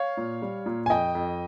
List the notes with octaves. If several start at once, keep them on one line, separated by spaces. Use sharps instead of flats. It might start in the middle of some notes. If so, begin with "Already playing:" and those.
Already playing: C#5 F5
A#2
G3
A#2
G#5
F2 D#5 G5
F2